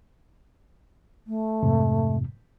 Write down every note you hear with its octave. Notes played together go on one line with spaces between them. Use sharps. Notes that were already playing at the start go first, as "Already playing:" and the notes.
A3
F2 G#2 C3